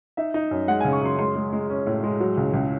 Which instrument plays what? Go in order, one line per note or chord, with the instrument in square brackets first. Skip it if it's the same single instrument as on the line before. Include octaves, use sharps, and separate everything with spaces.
[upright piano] D#4 E5
D#4
F#2
G#3 F#5
C#3 G#5
C#6
F#2 C6
G#3 C6
G#3
G#3
C#4
A2
G#3
F#3
C#2
C#2